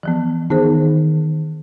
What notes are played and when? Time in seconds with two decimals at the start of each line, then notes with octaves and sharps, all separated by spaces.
0.03 E3 F3 B3
0.50 D#3 B3 G#4 C5